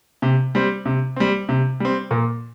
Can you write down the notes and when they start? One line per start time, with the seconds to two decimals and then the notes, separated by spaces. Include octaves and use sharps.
0.22 C3
0.55 G3 C4
0.86 C3
1.16 G3 C4
1.49 C3
1.80 G3 C4
2.11 A#2